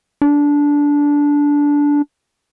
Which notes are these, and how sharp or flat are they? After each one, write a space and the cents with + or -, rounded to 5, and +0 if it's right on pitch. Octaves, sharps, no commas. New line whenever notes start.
D4 -15